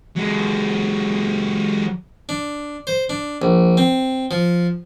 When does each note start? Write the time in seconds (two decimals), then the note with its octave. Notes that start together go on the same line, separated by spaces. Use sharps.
0.16 F#3 G#3
2.29 D4
2.87 C5
3.10 D4
3.42 A#1
3.77 C4
4.31 F3